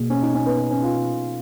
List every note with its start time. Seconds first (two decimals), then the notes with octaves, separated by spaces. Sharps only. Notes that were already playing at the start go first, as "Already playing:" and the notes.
Already playing: B2 A#3 G#4
0.10 C#4
0.22 D#4
0.34 C#4
0.46 B3
0.58 B3
0.70 C#4
0.82 F4